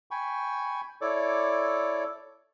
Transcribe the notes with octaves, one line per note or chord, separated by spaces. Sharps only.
G5 G#5 B5 C#6
E4 A4 C#5 D5 D6